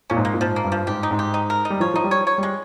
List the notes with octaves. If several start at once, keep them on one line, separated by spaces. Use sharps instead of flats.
A#2 C#4
G#2
A#3
A#2
G#2 F3
A#3
G2
F3
G#2 G4
D#4
G#2
G4
D#4
A#4
D#4
G3
F3 C#5
F3 D#4
G3
C#5
C#5
G3 G#3